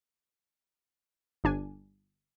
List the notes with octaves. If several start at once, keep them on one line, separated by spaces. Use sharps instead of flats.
G1 D4 G#5